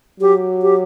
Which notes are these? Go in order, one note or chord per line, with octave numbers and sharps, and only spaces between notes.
F#3 G4
G4